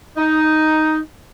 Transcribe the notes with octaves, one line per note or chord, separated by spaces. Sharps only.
D#4